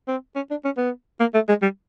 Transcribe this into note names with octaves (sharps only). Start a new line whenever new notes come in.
C4
C#4
D4
C#4
B3
A#3
A3
G#3
G3